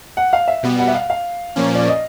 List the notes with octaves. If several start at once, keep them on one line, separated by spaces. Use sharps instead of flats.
F#5
F5
E5
B2 G3 B3
F#5
E5
F5
F5
A#2 F3 A#3 C#4
D5
D#5